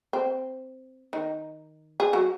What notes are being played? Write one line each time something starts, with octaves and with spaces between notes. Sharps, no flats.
C4
D#3 D#4
G#4
F#3 F#4